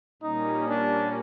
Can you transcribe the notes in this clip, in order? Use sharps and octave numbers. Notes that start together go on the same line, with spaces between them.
A#2 G3 A#3 C#4 D#4
D4